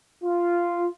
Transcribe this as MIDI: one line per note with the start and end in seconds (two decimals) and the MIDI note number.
0.23 0.86 65